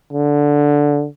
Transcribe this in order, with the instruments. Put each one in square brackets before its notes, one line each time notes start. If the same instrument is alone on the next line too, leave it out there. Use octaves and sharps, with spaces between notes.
[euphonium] D3